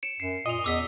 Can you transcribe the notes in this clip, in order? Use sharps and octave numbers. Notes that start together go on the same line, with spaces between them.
C#7 D7 E7
F#2 C7
A#2 D#5 D#7 F7
E2 D6 E6 B6